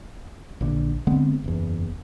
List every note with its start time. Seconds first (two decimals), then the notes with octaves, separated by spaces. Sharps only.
0.61 A#1 D3
1.07 D3 G#3 B3 C4
1.44 F#1 E2